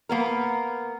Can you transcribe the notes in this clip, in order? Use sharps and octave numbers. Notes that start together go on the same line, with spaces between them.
A#3 B3 A#4